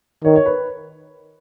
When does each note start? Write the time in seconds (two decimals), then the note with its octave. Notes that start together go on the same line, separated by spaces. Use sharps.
0.24 D#3 C#5
0.36 C#5
0.46 B4